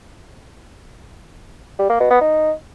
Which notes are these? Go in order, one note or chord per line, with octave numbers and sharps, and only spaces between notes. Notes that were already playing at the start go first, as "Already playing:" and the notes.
G3
A#3
B2
B3
D#4